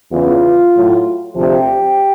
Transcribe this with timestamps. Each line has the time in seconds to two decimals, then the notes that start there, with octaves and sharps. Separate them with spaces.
0.12 E2 C#3 E3 F4
0.74 A2 F#3
1.36 D2 C3 F3 G4